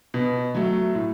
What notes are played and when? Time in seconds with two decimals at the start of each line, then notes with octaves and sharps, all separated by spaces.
0.14 B2
0.55 F#3 A3
0.95 A2